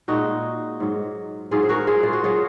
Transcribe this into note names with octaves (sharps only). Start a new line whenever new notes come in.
A#2 G#3 D#4 F#4
G#2 F#3
G#2 F#3 F4 G#4
C5
F#4 A#4
F4 G#4
F4
F#4
F#3 F4 G#4